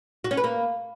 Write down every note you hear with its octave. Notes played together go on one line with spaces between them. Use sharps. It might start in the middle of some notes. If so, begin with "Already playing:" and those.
F#4
C#4
B4
A#3